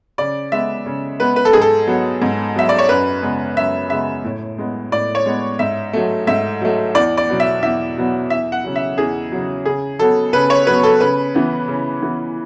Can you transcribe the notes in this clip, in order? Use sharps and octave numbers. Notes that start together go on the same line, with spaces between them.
C#3 D5
G#3 B3 E5
C#3
G#3 B3 B4
B4
A4
G#2 G#4
A4
F#3 B3
G#2
F#3 B3 E5
D5
C#5
F#2 B4
C#3 G#3 B3
F#2 E5
C#3 G#3 B3 E5
A2
G#3 B3
A2 D5
C#5
G#3 B3
G#2 E5
F#3 A3
G#2 E5
F#3 A3
E2 D5
D5
B2 F#3 B3
E5
E2 E5
B2 F#3 B3
E2 E5
F#5
C#3 F#3
E5
E2 G#4
C#3 F#3
C#3 G#4
F#3 B3 A4
C#3 B4
C#5
F#3 B3 B4
A4
C#3 B4
E3 B3
C#3
E3 B3